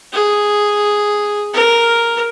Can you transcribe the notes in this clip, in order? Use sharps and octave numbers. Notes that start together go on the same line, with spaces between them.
G#4
A#4